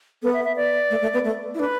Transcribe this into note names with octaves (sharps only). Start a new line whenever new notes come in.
B3 A4
E5
E5
D5
A3
A3
B3
A3
E4
D4 B4